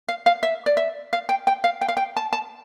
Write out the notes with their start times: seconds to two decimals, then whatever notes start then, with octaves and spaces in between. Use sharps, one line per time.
0.08 F5
0.26 F5
0.43 E5
0.66 D5
0.77 E5
1.13 F5
1.29 G5
1.47 G5
1.64 F5
1.81 G5
1.88 F5
1.97 G5
2.17 A5
2.33 A5